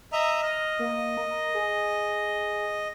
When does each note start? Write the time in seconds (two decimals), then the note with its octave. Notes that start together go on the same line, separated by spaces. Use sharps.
0.13 D#5 E5 A#5
0.42 D#5 F6
0.79 A#3
1.17 A#4
1.54 G#4